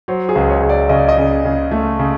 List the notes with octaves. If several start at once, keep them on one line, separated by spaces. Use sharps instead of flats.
F#3 C5
G#4
C#2
C#5
C#2
D5
C#3 D#5
D5
D#5
C#3
C#3
A3
C#3